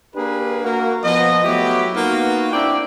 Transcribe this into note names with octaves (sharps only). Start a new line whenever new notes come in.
A#3 D4 G4 G#4 B4
A#3 F#4 A#4
F3 B3 D#5
F#3 A3 B3 E4 F#4 G4
A#3 B3 D#4 F4 F#4
C4 D4 E4 D5 E5 G5